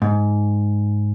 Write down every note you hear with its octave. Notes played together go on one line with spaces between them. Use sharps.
G#2